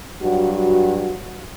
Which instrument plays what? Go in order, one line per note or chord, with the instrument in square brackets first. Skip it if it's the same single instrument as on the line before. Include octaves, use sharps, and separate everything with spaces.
[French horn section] G2 F#3 F#4